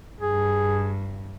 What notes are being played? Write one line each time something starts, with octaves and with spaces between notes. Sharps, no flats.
G2 G#4